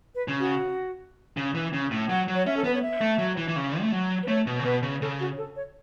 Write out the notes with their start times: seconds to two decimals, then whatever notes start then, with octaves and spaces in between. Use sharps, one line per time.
0.15 B4
0.28 C#3
0.40 F#4
1.37 C#3
1.55 E3
1.73 C#3
1.91 A2
2.09 F#3 F#5
2.28 F#3
2.35 C#5
2.46 C#4 E5
2.57 A4
2.64 B3 B4
2.74 C#5
2.82 E5
3.01 A3
3.18 F#3
3.37 E3
3.48 E3
3.56 C#3
3.81 A3
3.92 F#3
4.23 B4
4.28 A3 C#5
4.47 B2
4.59 C#3
4.65 B2 B4
4.83 C#3
5.01 C#3 A4
5.20 F#4
5.38 A4
5.56 C#5